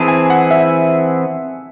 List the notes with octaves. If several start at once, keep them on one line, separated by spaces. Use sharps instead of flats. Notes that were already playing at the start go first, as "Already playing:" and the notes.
Already playing: E3 C4 E4 G#4 A5
G#5
F#5
E5